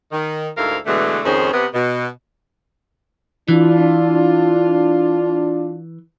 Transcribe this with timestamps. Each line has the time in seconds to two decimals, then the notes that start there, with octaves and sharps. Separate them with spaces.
0.12 D#3
0.57 D2 G#2 E4 A4 A#4 F5
0.86 B2 D3 E3 G#3 A3
1.25 F2 G#2 D#3 C#4 G#4 C5
1.52 C3 B3
1.74 B2
3.48 E3 D4 F4